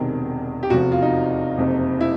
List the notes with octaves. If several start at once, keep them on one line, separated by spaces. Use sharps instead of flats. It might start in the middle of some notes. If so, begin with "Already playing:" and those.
Already playing: E1 E2 C3 D#3
G4
F1 E2 C3 F3 F#4
F4
D#4
F#1 F2 C3
E4